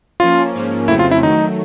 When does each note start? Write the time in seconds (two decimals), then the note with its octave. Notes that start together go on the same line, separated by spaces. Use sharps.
0.20 F3 A#3 C#4 F4
0.54 G#2 F3 A#3 C#4
0.88 F2 C#3 F#3 A3 C4 E4
0.99 F4
1.11 E4
1.23 D#3 F#3 A3 D#4